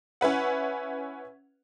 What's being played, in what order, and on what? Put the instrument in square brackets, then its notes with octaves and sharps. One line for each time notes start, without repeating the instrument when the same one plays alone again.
[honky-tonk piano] C#4 E4 B4 F#5